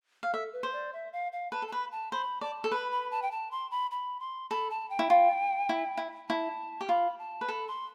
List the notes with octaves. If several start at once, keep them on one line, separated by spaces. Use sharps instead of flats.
F5
A4 E5
B4
C5
D5
E5
F5
F5
B4 A5
A4
A5
B4 B5
A5
C5 B5
D5 A5
A4
B4 B5
B5
A5
G5
A5
C6
B5
B5
C6
A4 B5
A5
G5
E4
F4
E4
E4
E4 A5
G4
F4 B5
A5
B4
A4 B5
C6